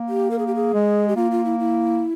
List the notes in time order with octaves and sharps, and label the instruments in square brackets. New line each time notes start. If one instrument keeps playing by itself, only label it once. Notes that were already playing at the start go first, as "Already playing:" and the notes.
Already playing: [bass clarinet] A#3
[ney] G4
A#4
G#4
G4
G#4
[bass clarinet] G#3
[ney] G4
[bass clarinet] A#3 [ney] F4
[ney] F4
E4
E4